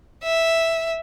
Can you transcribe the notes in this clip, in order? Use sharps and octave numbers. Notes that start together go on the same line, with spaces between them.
E5